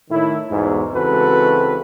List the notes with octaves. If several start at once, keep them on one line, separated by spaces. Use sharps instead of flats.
A2 D#3 E4
B1 E2 G#2
C#2 E3 C4 F#4 A4 B4